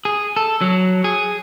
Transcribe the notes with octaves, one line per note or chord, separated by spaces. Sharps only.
G#4
A4
F#3
G#4